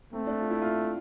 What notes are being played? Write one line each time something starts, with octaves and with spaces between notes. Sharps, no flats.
A3 C4
D4
F4
E4
F4